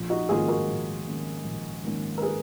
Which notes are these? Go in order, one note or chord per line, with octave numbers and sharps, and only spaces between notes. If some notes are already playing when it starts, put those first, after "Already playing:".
Already playing: A#1
D#4 F#4
G#2 D#3 A#3 C#4 F4 G#4
F#4 A#4
A#1
G#2 D#3 A#3 C#4
A#1
G#2 D#3 A#3 C#4
A#4
G#4 B4